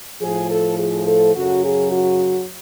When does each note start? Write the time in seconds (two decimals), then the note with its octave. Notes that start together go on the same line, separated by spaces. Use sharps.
0.21 A2 F3 G#4
0.49 A4
0.78 G#4
1.06 A4
1.34 F#2 C#3 F#3 F#4
1.62 G#4
1.91 F#4